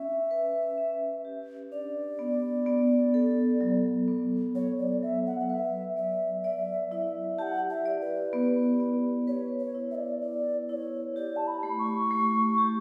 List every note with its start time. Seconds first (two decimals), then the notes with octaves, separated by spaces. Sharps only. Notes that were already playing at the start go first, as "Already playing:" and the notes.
Already playing: C#4 E5
0.31 B4
0.77 C#4
1.25 G4
1.72 D4 D5
2.19 B3
2.66 B3
3.14 A4
3.61 F#3
4.08 B3
4.55 F#3 C#5
4.79 D5
5.03 F#3 E5
5.27 F#5
5.39 F#5
5.50 B4 E5
5.96 D5 E5
6.44 D5 E5
6.91 E4 E5
7.38 G4 F#5 A5
7.70 E5
7.86 D5
8.01 B4
8.33 B3
8.80 B3
9.27 B4 C#5
9.59 C#5
9.74 E4
9.91 E5
9.95 D5
10.22 E4 D5
10.69 E4 C#5 D5
11.16 G4 D5
11.36 A5
11.47 B5
11.63 A3
11.79 C#6
12.11 A3
12.58 G4